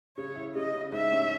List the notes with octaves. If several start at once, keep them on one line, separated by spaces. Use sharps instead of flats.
C#3 C#5
E4
C#3 D#5
C#3
G#2 E5
C#4